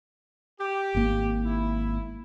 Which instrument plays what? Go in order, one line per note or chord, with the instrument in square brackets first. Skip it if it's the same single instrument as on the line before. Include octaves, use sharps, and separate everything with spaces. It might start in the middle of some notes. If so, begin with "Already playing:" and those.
[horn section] G4
[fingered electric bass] G#1 G#2 A#3
[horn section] E4